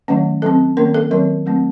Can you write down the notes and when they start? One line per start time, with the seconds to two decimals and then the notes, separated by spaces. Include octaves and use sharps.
0.08 D#3 F#3 A3 C#4
0.42 F#3 C4 A4
0.77 D#3 A#3 C#4 A#4
0.94 A4
1.11 D#3 F#3 C4 A#4
1.46 F#3 A3 C4